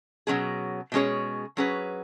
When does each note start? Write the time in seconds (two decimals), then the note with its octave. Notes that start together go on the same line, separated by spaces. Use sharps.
0.27 B2 F#3 A#3 C#4 G#4
0.92 B2 G#3 C#4 G#4 C#5
1.57 F#3 C#4 G#4 B4